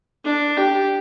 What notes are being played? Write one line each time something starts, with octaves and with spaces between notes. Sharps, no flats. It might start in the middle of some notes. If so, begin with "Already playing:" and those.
D4
G4